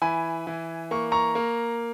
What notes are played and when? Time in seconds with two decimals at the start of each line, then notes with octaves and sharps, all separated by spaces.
0.02 E3 G#5 B5
0.47 E3
0.91 A#3 C#6
1.12 A#5 C#6
1.35 A#3